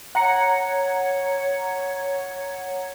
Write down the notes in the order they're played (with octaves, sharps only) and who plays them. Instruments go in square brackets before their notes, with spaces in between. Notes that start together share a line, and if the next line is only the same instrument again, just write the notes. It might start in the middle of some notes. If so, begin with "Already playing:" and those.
[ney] C#5 [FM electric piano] F#5 A#5 C#7